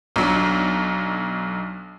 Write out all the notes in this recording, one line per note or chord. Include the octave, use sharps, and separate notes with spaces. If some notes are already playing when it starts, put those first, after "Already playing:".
B1 F#3 D4